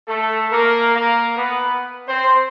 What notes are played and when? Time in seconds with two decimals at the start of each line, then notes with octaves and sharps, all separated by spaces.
0.08 A3 A4
0.51 A#3 A#4
0.94 A#3 A#4
1.37 B3 B4
2.07 C4 C5